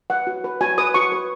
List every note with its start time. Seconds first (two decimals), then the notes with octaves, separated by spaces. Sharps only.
0.10 B4 F#5
0.27 F#4
0.44 B4
0.61 F#4 G#5
0.78 B4 D#6
0.94 F#4 C#6
1.12 B4